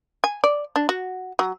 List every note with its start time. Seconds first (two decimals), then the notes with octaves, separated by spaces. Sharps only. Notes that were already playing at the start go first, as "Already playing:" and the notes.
0.24 G#5
0.44 D5
0.76 D4
0.89 F#4
1.39 F#3